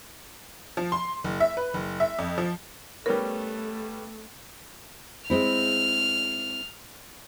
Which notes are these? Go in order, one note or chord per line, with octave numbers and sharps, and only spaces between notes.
F3
C6
F#1
E5
B4
F#1
E5
F2
F3
G3 A3 B3 C#4 A#4
G#3 C4 E4 F6